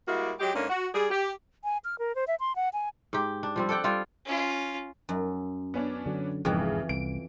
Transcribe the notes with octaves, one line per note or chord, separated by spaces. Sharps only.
G3 G#3 A#3 E4 F#4
F#3 G#3 G4
G#2 A3 A#3 C#4 D4
F#4
G3 G#4
G4
G#5
F6
A#4
C5
E5
C6
F#5
G#5
G#2 G4
D4
F3 G3 C4
A4 D5 F#5 G5
G3 F4 F5 G5
C#4 F4
F#2
B3 C#4 D4
D3 F#3
E1 F2 G#2 C#3 E3
C2 D7